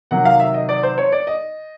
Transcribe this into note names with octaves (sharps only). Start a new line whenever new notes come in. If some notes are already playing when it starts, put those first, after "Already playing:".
C3 D#3 F#3 F#5
F5
E5
D#5
D5
C5
C#5
D5
D#5